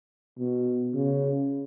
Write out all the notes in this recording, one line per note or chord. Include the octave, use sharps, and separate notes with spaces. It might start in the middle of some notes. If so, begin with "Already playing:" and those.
B2
C#3